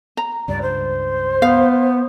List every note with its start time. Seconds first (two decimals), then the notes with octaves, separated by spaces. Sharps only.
0.17 A#5
0.48 C#2 G2 D5
0.61 C5
1.42 B3 F5